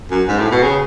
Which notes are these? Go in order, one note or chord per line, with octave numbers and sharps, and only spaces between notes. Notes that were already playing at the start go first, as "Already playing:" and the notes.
F#2
G#2
A2
B2
C#3